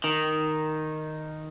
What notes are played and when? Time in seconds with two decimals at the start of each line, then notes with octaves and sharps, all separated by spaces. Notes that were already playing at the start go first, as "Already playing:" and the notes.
0.04 D#3